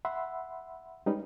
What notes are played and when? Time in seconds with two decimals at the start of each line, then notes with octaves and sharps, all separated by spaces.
0.05 E5 F#5 B5 C6 E6
1.06 G3 G#3 C#4 D#4 B4